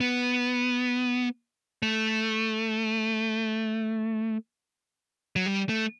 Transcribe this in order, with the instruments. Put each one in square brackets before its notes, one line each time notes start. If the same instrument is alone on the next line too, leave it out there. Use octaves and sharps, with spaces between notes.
[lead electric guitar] B3
A3
F#3
G3
A3